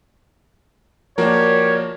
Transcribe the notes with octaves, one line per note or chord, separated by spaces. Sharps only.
F3 A#3 F#4 G4 A#4 C#5 D5